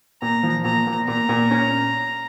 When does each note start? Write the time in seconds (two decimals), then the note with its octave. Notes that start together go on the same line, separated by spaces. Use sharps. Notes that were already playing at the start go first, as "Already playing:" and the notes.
0.22 A#2 A#5
0.43 F3
0.64 A#2 A#5
0.87 A#2
1.08 A#2 A#5
1.29 A#2
1.51 C#4